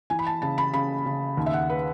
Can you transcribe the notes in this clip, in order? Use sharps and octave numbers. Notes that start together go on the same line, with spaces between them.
E3 G#5
B5
A5
C#3 A5
B5
C#3 B5
C#3
D#2
E5
F#5
B4